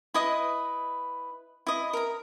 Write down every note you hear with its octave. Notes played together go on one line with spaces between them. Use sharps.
E4 B4 D#5 D#6
E4 D#5
A#4 A#5